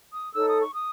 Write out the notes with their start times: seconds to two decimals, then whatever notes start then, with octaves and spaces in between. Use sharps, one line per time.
0.13 D#6
0.34 D#4 A4 C#5 E6
0.47 D#6
0.59 C#6
0.73 D#6